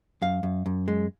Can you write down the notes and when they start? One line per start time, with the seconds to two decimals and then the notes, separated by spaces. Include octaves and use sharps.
0.22 F#2 F5
0.43 F#2
0.66 F#2
0.88 G#3